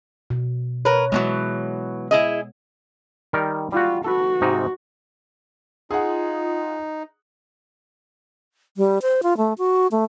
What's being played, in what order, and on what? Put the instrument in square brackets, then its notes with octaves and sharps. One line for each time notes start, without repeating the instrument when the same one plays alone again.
[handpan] B2
[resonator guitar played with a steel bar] A#4 B4 [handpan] C#5
[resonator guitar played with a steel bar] B2 E3 F#3 [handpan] G#3 B3
[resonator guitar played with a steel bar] E4 G#4 D#5
[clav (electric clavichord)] D#3 G3 A#4
[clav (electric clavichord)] G3 F#4 [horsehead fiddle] F4
[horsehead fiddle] F#4 [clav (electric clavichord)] A4 B4
[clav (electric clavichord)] G#2 C3 D#4
[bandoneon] D#4 [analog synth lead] F4 [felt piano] G#4 F#5
[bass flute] G3
C5
F4
A3
F#4
A3